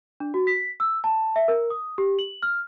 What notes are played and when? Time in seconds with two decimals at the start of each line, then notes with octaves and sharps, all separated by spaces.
0.20 D4
0.34 F#4
0.47 B6
0.80 E6
1.04 A5
1.36 E5
1.48 A#4
1.70 D#6
1.98 G4
2.19 F#7
2.42 F6